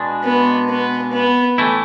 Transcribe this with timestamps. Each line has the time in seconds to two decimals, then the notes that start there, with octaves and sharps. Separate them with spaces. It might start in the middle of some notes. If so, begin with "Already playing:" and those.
Already playing: B2 G#3 D4
0.24 B3
0.69 B3
1.13 B3
1.58 A2 E3 A3 E4